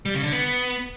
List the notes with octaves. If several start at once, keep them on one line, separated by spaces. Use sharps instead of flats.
G3
C#3
D3
B3